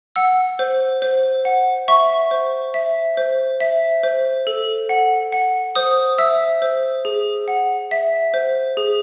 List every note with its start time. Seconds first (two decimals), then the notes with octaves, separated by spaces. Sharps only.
0.16 F#5 E6
0.59 C5
1.02 C5
1.45 F#5
1.88 E5 C#6
2.31 C5
2.74 E5
3.17 C5
3.60 E5
4.03 C5
4.47 A4
4.89 F#5
5.33 F#5
5.75 C5 D#6
6.19 E5 E6
6.62 C5
7.05 G#4
7.48 F#5
7.91 E5
8.34 C5
8.77 G#4